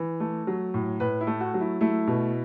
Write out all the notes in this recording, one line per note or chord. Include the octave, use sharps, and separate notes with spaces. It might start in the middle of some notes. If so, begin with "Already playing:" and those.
Already playing: E3
A3
F#3
A2
A2 B4
E4
A3
F#4
F#3
E4
A3 E4
B2